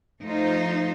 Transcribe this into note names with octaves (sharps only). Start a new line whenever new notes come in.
F3 A3 D#4 F4 C5